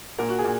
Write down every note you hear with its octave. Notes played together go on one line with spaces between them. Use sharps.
A#2 A#4
F#4
G#4
A#2